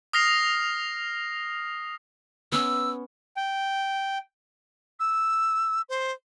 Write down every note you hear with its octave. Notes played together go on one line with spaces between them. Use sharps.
D#6 F6 A#6 C7 F7
B3 C#4 E6
G5
E6
C5